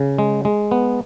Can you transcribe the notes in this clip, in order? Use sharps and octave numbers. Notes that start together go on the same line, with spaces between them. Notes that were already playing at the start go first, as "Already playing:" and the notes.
Already playing: C#3
G#3
G#3
B3